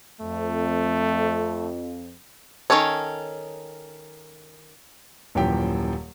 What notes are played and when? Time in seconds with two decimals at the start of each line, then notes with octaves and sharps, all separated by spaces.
0.21 F2 A3
2.70 D#3 C4 C#4 A4 C#5
5.35 D#1 F#2 A#2 E3 G4 G5